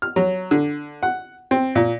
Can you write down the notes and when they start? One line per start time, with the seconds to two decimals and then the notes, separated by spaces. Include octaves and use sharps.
0.02 F6
0.16 F#3
0.51 D3
1.03 F#5
1.51 C4
1.75 A#2